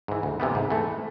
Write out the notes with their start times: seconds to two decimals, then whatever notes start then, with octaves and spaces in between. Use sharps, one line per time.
0.08 G#2 E3
0.23 D2
0.40 C3 E3 G3 B3
0.55 G#2
0.70 E3 A3